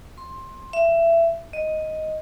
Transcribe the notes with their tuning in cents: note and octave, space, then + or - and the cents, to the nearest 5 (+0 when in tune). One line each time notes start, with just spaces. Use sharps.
C6 +15
E5 +20
D#5 +5